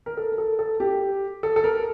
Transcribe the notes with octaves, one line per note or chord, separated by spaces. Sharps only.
A#4
A4
A#4
A4
A4
G4
A4
A4
A#4